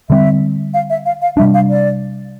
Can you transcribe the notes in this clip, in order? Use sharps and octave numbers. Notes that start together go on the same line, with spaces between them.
D3 G3 C4 E5
F5
E5
F5
F5
C3 G3 D4 E5
F5
D5